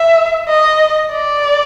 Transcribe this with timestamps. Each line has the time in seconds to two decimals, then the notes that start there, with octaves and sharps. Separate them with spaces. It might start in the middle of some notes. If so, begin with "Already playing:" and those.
Already playing: E5
0.48 D#5
1.12 D5